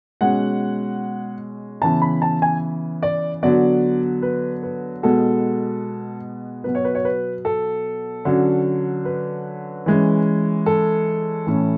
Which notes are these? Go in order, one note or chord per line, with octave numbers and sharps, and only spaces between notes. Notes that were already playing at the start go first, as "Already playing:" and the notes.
B2 G#3 C#4 F#5
C#3 E3 B3 A5
B5
A5
G#5
D5
D3 F#3 B3 D5
B4
B4
B2 G#3 B3 A4
B2 F#3 B3 B4
C#5
B4
C#5
B4
A4
D3 F#3 C#4
B4
E3 G#3 C#4
A4
A2 E3 A3 C#4